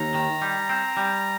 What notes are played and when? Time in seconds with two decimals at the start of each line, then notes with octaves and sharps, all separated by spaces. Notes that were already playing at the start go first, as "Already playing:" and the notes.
Already playing: D#2 A#5
0.14 D#3
0.42 G3
0.69 C4
0.97 G3